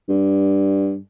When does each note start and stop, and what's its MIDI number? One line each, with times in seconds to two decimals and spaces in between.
0.09 0.98 43